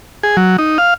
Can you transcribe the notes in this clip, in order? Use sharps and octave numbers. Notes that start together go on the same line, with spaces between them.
G#4
F#3
D#4
F5